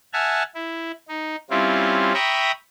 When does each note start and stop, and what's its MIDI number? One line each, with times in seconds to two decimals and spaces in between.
0.13 0.43 76
0.13 0.43 78
0.13 0.43 80
0.13 0.43 81
0.13 0.43 89
0.55 0.92 64
1.08 1.36 63
1.50 2.13 55
1.50 2.13 60
1.50 2.13 61
1.50 2.13 64
1.50 2.13 65
2.14 2.51 76
2.14 2.51 79
2.14 2.51 82
2.14 2.51 83
2.14 2.51 85
2.14 2.51 87